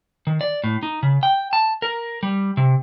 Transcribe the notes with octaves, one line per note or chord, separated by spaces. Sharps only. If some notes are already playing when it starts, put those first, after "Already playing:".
D#3
D5
A2
D#4
C#3
G5
A5
A#4
G3
C3